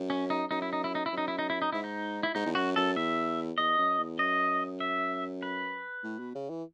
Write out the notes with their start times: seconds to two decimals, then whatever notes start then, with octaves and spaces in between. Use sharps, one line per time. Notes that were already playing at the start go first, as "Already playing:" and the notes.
Already playing: F#2
0.10 C#4
0.30 D#4
0.51 F#2 D#4
0.62 E4
0.73 D#4
0.84 E4
0.95 D#4
1.06 E4
1.12 F#2
1.18 D#4
1.28 E4
1.39 D#4
1.50 E4
1.62 D#4
1.72 G#2 E4
1.84 D#4
2.23 E4
2.35 G#2 D#4
2.46 E2
2.55 F#2 F#4
2.76 F#2 A4
2.96 E2 E5
3.58 E2 D#5
3.78 F#2
3.99 E2
4.19 F#2 D#5
4.80 E5
5.42 B4
6.03 A2
6.19 B2
6.35 C#3
6.49 E3